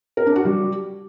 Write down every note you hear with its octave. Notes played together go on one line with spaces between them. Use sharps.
A#4
D4
F#4
G3